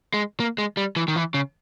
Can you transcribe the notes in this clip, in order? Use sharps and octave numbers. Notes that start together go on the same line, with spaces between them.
G#3
A#3
G#3
G3
E3
D#3
E3
C#3